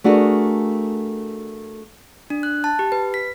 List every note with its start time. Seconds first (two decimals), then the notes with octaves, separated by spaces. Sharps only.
0.04 A3 D4 F#4 G#4 A#4
2.30 D4
2.43 F#6
2.64 A5
2.79 G4
2.92 B4
3.14 B6